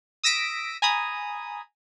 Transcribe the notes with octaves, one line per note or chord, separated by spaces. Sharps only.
D#6 E6 A#6 B6 D7
G#5 A#5 B5 D#6